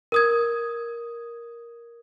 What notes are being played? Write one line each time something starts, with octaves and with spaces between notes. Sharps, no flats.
A#4 D#6 G#6